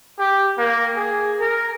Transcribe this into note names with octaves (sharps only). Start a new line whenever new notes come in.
G4
A#3
G#4
A#4